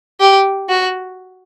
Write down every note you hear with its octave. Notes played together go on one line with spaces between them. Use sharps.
G4
F#4